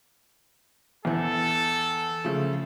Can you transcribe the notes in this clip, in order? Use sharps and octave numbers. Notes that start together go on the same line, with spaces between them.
E2 E3 A4
C#3 F3 A3